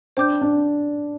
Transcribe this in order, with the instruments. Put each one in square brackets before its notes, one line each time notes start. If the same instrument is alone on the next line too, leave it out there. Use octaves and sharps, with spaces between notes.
[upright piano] D4 [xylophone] C5 G5 D6 G6
[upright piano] D4